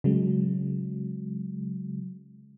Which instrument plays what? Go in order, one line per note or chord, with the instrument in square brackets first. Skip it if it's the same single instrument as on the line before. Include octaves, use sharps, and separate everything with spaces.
[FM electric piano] C#3 F#3 G#3